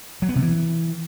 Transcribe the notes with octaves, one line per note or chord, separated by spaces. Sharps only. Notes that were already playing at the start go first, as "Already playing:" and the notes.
F#3
B3
C3
E3